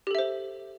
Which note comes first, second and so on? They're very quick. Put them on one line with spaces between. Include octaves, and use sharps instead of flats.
G4 A4 E5 C5